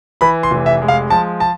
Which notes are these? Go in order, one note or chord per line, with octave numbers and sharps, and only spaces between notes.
E3 B5
C6
F1
E5
G#3
F5
F3 A5
A5